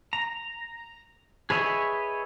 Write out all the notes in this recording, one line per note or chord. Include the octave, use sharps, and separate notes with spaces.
A#5
G#4 B4 C#5 D#5 E5